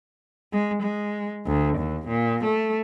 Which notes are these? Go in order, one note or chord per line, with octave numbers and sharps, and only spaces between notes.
G#3
G#3
D2
D#2
A#2
A3